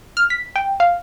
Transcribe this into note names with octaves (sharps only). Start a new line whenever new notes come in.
F6
B6
G5
F5